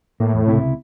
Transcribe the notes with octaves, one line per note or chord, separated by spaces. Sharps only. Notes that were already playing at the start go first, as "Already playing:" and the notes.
A2 A#3
E2
C#2 C3 E4